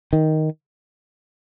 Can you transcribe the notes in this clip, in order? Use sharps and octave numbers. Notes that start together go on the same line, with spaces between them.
D#3